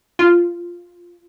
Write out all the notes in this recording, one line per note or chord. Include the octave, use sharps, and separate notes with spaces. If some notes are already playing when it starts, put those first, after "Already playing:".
F4